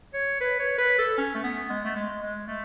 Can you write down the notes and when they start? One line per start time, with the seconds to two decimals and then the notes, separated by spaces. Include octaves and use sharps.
0.14 C#5
0.40 B4
0.59 C#5
0.78 B4
0.98 A4
1.17 C#4
1.34 A3
1.43 B3
1.70 G#3
1.84 A3
1.95 G#3
2.22 G#3
2.47 A3